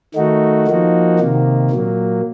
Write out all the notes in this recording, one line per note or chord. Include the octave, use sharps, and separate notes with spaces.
D#3 A3 D#4 F#4
F3 A#3 D#4 F#4
C3 D#3 A#3
A#2 F#3 A#3